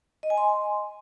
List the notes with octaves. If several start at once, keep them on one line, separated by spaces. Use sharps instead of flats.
D#5
G#5
C6